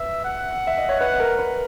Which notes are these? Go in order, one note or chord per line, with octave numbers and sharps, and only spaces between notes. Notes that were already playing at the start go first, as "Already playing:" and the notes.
Already playing: B4 E5
F#5
E5
D#5
C#5
B4 F#5
A#4
B4